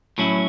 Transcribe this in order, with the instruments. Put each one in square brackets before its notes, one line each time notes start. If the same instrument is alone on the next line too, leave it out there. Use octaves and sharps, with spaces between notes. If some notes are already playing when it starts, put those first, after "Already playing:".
[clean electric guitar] A2 F#3 C#4 E4